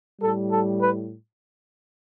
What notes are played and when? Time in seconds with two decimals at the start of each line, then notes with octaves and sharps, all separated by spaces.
0.21 A2 G3 A4
0.50 A4
0.80 B4